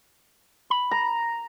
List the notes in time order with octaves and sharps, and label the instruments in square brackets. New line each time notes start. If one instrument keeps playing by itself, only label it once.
[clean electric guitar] B5
[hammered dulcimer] A#5